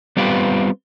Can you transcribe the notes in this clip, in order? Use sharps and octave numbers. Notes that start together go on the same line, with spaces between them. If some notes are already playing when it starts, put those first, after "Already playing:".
G3 B3 C4 F4 G4 B4